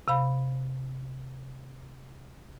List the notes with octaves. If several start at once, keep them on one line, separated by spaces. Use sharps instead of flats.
C3 F5 B5